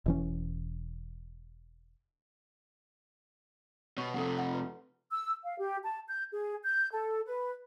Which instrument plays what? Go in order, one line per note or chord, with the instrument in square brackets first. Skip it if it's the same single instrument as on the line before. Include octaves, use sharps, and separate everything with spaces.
[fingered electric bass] E1 E3 C#4
[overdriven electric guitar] B2 [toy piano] C#5 C#6
[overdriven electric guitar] F2 C3 [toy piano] A4 F#5
[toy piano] F#5
B4
[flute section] E6
F5
G4
A5
G6
G#4
G6
A4
B4